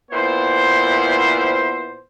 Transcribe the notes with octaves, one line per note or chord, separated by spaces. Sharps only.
A#2 B3 E4 C5